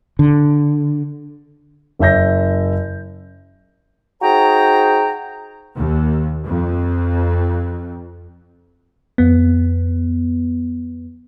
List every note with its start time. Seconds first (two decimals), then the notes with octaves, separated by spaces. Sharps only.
0.19 D3
1.99 F#1 C#5 E5 G6 A#6
4.22 D#4 F#4 G#4 C5 G5 A#5
5.75 D#2
6.45 F2
9.18 F2 B3